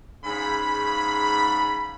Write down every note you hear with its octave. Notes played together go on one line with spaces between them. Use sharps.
G#2 C#3 B5